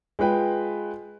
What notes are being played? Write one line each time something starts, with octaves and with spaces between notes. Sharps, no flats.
G#3 F4 B4 G5